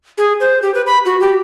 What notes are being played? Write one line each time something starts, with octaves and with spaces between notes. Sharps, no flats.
G#4
C5
G4
B4
B5
F#4
G4